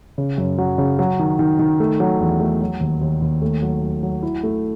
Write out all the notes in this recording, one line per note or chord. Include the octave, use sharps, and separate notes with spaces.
C#3
F#2
F#3
C#3
F#3
D#3
D#3
D#3
A3
F#3
E2
A3
F#3
D#2
D#2
D#2
A3
F#3
F#3
F#3
E4
A3